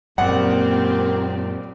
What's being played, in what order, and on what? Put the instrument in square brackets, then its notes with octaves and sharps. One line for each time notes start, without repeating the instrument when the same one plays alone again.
[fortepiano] A#1 F#5 [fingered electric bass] F#2 A#2 [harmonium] A#3 [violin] C4 G4